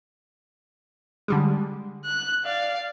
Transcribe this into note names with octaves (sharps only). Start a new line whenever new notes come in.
D3 G3 G#3
F#6
D5 F5